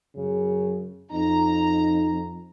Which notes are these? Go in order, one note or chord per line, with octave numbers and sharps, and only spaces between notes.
F#2 C#3
F2 D#4 A#5